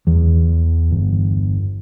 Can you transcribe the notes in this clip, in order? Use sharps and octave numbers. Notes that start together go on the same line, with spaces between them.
E2
G1